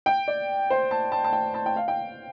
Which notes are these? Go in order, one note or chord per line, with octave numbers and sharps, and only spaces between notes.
G5
D5
C5
A5
A5
A5
G5
A5
G5
F5
G5